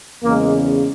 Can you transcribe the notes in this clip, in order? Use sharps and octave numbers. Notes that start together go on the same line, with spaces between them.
E2 C#3 G#3 A#3